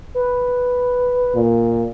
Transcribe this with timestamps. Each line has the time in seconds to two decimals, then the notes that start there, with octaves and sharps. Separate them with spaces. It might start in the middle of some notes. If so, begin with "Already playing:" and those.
0.15 B4
1.35 A#2